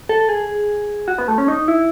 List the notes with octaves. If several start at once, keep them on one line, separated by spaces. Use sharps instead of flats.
A4
G#4
F#4
B3
A3
C#4
D#4
E4